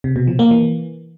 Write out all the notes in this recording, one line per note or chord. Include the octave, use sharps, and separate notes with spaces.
C3
B2
F3
A#3
E3